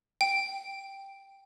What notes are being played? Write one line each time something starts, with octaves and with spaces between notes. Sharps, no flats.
G5